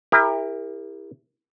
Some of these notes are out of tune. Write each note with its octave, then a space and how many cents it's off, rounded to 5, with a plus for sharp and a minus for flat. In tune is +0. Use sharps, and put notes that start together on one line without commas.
E4 +0 G4 +40 A#4 +0